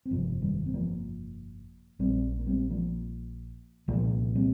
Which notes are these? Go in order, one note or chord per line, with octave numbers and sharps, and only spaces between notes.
C4
G1 F2 C3 F3 A#3
D#3 G3
C4
F3 A#3
A#1 A#2 G3 C4
A#3
G3 C4
F3 A#3
C2 A#2 F3 A#3
G3 C4